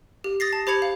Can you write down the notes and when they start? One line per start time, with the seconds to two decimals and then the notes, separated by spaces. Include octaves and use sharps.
0.24 G4
0.40 D#6 A6 A#6 C7
0.53 A5
0.67 G4 C5 B5 G#6 C#7 F7
0.82 F5